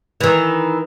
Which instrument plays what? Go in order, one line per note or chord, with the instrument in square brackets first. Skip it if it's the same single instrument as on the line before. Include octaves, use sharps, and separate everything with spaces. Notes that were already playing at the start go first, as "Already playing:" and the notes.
[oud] D#3 E3